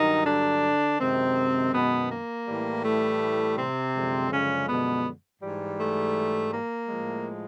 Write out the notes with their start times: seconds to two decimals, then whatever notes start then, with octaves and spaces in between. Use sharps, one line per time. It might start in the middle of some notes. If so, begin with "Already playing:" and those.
Already playing: G2 D#3 F#3 D#4
0.26 D3 D4
0.99 F#2 C3 D#3 G#3 C4
1.73 B2 B3
2.10 A#3
2.47 A2 E3 G3
2.83 A3
3.57 C3 C4
3.94 F#2 D3 F3 G#3
4.30 C#3 C#4
4.67 B2 B3
5.41 G#2 E3 G3
5.78 A3
6.52 A#3
6.89 A2 F3 G#3